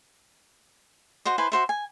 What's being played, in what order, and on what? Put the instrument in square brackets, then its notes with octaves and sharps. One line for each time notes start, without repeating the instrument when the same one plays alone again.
[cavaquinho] F#4 C5 D#5
E4 B4 C5 G#5
F#4 C5 E5
G#5